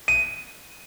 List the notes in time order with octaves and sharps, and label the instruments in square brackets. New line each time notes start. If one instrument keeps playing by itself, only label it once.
[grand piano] D#7